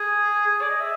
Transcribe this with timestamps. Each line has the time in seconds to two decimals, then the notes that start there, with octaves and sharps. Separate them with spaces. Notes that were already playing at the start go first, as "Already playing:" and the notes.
Already playing: G#4
0.46 G#4
0.62 D5
0.69 D#5
0.80 E5